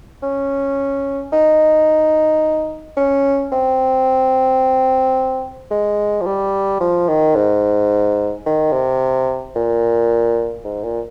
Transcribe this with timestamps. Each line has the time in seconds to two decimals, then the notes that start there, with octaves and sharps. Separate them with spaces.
0.23 C#4
1.33 D#4
2.97 C#4
3.52 C4
5.71 G#3
6.21 F3
6.26 G3
6.80 F3
7.08 D#3
7.35 G#2
8.46 D#3
8.72 C3
9.55 A#2
10.64 G#2
10.83 A#2